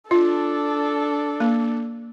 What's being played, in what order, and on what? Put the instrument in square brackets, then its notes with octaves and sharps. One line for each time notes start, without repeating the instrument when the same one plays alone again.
[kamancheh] D4 A4 [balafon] F4
[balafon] A#3